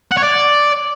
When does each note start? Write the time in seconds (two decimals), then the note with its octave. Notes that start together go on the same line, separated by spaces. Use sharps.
0.11 F#5
0.17 C#5
0.23 D5